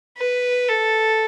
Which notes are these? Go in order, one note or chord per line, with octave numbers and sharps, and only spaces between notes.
B4
A4